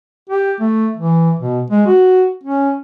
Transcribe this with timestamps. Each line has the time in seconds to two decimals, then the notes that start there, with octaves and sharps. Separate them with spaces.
0.29 G4
0.60 A3
0.97 E3
1.39 B2
1.70 G#3
1.87 F#4
2.44 C#4